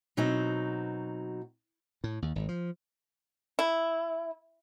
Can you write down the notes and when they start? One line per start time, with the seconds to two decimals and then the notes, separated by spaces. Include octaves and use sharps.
0.17 B2 F#3 C4 D#4
2.04 A2
2.22 D#2
2.35 G#1
2.49 F3
3.59 E4